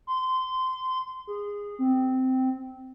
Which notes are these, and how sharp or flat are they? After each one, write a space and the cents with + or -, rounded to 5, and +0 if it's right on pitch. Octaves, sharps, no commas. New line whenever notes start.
C6 -20
G#4 -20
C4 -10